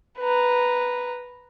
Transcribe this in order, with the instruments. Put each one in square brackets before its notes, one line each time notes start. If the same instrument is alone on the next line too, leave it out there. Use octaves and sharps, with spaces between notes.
[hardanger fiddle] B4 A#5